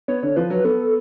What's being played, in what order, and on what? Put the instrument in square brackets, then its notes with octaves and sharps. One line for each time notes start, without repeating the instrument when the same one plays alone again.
[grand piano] B3 [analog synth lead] C#5
[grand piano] D3
[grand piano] F3 [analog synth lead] B4
[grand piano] F#3
[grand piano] B3 [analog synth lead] A4